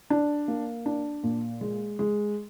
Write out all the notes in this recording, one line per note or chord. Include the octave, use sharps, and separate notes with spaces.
D4
A#3
D4
A#2
G#3
G#3